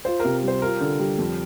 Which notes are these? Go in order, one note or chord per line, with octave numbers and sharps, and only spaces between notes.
F4 C5
C3 A#4
G3 C5
F4 A#4
D3
G3
F2